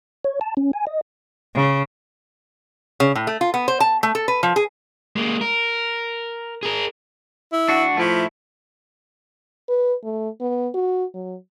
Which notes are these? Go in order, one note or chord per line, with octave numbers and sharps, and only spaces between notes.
C#5
A5
C#4
G#5
D#5
C#3
C#3
A2
A3
F4
B3
C5
A5
A3
A4
B4
F3
G#4
G#3 A#3
A#4
G#4 A#4
E4
D4 F#4
F3 A3 E4
B4
A3
B3
F#4
F#3